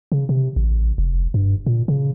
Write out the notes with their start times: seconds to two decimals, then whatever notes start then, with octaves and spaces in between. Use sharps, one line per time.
0.12 C#3
0.29 C3
0.56 A1
0.98 F1
1.34 G2
1.66 A#2
1.88 C#3